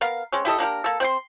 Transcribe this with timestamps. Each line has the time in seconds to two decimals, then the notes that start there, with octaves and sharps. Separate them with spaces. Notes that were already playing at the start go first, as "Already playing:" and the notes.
0.01 B3 A#4 F5
0.32 G#3 C4 C#4
0.45 E4 G4 A4 D#5
0.58 A#3 D4 G4 A#4
0.84 A#3 A4
1.00 C4 G5 C6